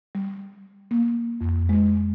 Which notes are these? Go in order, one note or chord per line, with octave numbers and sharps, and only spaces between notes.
G3
A#3
F2
G#3